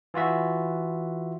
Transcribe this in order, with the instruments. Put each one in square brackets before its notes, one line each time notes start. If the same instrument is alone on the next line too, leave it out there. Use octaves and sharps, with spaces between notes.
[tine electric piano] E3 F4 F#4 E5